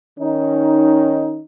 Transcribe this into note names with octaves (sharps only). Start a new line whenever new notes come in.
D#3 C#4 D#4